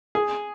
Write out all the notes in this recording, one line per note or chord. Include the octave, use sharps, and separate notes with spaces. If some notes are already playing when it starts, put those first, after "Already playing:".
G#4